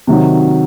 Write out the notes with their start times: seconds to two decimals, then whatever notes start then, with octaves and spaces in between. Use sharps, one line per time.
0.07 C3 D#3 F#3